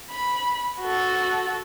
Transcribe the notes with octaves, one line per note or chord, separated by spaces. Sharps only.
B5
F#4 A4